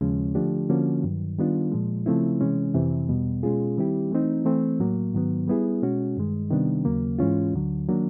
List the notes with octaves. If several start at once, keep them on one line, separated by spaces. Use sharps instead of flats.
D#2 C#3 F3 G#3 C#4
D3 F3 A3 D4 G4
D3 F3 A#3 C#4 F#4
G2 D#3 F#3
D#3 G3 B3 D4 F4
A#2 F3 G#3
C#3 F3 A3 C4 E4
C3 E3 G#3 C#4
F2 C3 E3
E2 B2 G3 B3
B2 G#3 C#4 F4 G#4
D#3 G3 C4 E4 G4
E3 A3 C4 D#4
E3 A3 C4
A2 F#3 A#3
G#2 D#3 F#3 B3
G3 B3 E4 G#4
B2 G#3 C#4 F#4
G2 D#3 G#3
C3 D#3 G3 B3 D4
D#2 C#3 F#3 A#3
G#2 E3 G#3 C#4 F4
D2 D3 F#3
D#3 F#3 A#3 D4